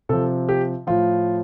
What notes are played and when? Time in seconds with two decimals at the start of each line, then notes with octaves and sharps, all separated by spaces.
0.09 C3 F3 A4
0.49 G4
0.87 A2 F3 F4